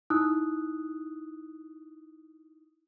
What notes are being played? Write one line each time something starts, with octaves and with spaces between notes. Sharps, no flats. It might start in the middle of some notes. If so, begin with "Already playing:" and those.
D#4 E4 D#6 E6 F#6